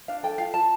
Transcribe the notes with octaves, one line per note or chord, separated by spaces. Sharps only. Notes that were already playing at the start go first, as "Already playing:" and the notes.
D4 F5
A4 G5
F4 F5
F4 A5